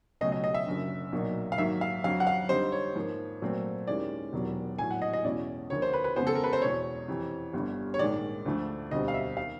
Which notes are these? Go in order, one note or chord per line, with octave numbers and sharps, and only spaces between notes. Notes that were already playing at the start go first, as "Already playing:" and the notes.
C#2 B2 F#3 A3 C#4 D#5
D#5
D#5
E5
F#1 F#2 D3
B1 A#2 F#3 A#3 D#4
F5
G#2 D#3 F#3 A#3 E5
F5
F2 D3 F#3 F5
F#5
F5
F2 D3 G3 C4 D#4 C5
C#5
G#2 F3 A#3
A#2 F#3 A3 C4
D#2 D#3 G#3 C#4 E4 D5
E1 E2 C3 D#3 F#3
A#1 A2 F#3 G#5
F#5
D#5
D#5
E2 B2 G#3 C#4 E4 D5
D2 D3 F3 A#3 C#5
C5
B4
B4
F2 C#3 F3 G#3 B3 C5
A4
A#4
B4
C5
E2 B2 G#3 C#5
F2 C3 E3
G1 G2 D3
C#5
A#1 G#2 D#3 G#3 D5
D2 D3 F3 A3
E1 D2 D3 G3 C4 D#5
F5
E5
D#3 F5